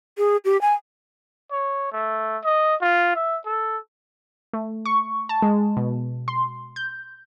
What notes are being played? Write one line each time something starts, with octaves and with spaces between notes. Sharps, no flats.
G#4
G4
G#5
C#5
A3
D#5
F4
E5
A4
A3
C#6
A5
G#3
B2
C6
G6